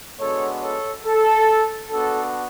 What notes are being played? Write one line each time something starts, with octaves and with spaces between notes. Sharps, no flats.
G#3 B3 D4 F#4 A4 C#5
A4 C#5
A4
B3 D4 F#4 A4